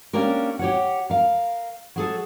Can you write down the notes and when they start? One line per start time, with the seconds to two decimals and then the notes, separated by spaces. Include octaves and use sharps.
0.13 A#3 C#4 D4 G4 A#4
0.59 G4 C#5 F#5
1.10 A#4 F5
1.96 F#3 G#4 A4